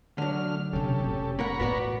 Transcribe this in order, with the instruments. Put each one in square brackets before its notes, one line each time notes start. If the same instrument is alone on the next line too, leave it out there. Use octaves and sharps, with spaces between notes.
[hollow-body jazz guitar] D3 F#3 [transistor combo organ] A3 D4 F6
[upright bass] C3 A#3 [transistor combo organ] C#4 G4 A4
[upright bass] F1 A2
[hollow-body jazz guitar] A#3 A#4 F#5 [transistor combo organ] A#5 B5 C#6
[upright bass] A2 E3 [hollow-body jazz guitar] B3 F#4 D5